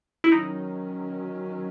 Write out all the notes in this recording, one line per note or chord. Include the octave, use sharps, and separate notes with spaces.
E4
D#3 F#3 C#4 D#4